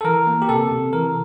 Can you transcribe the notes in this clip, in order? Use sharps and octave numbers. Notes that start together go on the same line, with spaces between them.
A4
E3 A#4
A#3
G4
C3 A4
C3
E3 A#4